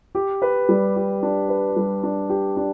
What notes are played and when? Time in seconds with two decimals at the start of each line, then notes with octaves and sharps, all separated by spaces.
0.15 G4
0.42 B4
0.69 G3
0.96 G4
1.23 D4
1.49 B4
1.76 G3
2.03 D4
2.30 G4
2.57 D4